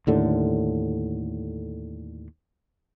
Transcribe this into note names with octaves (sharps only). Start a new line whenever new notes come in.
D#2 A2 D3